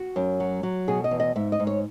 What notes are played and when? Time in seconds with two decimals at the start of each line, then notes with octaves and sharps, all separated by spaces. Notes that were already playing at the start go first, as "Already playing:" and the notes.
Already playing: F#4
0.16 F#2
0.40 F#3
0.63 F#3
0.88 B2 G#4
1.04 D#5
1.11 E2
1.20 D#5
1.36 G#2 E5
1.52 D#5
1.60 G#2
1.67 C#5